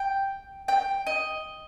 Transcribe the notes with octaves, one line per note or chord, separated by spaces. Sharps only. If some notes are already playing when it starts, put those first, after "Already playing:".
Already playing: G5
G5
D#5